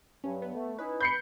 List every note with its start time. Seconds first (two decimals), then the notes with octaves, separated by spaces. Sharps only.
0.24 G2 F#3 C#4
0.42 B3
0.55 A3
0.78 C#4 D#4 E4 B4
1.01 B5 G6 C7 C#7